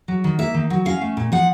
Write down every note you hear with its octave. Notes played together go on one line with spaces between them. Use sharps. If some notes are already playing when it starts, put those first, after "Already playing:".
F#3
D#3
A#3 E5
D#3
F#3
C#4 F5
A3
A#2
F3 F#5